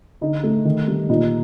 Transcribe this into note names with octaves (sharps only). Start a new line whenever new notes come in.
D3 D#4
A3
D#3
G3
A#2 D#4